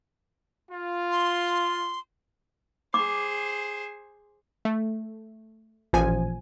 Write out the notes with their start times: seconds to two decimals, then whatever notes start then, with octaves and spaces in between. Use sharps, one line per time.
0.72 F4
1.10 C6
2.94 G#4 C5 D6
4.65 A3
5.93 A1 A#2 F3 G#5